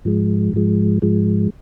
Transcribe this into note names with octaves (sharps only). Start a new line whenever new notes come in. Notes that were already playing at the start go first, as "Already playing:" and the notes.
G#2 F3 G#3
G#2 F3 G#3
G#2 F3 G#3